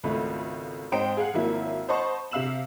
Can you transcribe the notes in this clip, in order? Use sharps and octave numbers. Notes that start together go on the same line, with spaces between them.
G#1 C#2 A3 B5
G#2 C4 C5 D#5 G5 D7
G#4 F5 F#5
G#1 F3 F#3 A#3 E4
C5 D#5 F#5 A5 B5 C#6
C3 E5 F5 E6 E7 F#7